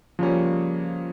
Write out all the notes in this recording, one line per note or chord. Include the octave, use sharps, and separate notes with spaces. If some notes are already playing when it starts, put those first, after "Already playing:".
C#3 F3 G3 A#3 C#4